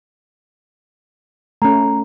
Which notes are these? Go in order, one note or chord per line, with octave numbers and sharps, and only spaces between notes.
A3 C#4 A#5